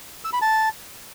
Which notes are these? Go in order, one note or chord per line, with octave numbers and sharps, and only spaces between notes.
E6
B5
A5